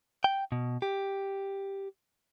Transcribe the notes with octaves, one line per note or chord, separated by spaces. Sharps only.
G5
B2
G4